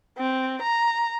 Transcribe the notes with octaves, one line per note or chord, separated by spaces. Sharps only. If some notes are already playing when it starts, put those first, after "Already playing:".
C4
A#5